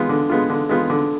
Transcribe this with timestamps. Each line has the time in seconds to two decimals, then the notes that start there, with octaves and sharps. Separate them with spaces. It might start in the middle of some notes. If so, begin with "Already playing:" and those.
Already playing: G#3 B3 F4
0.09 D3
0.30 G#3 B3 F4
0.50 D3
0.69 G#3 B3 F4
0.90 D3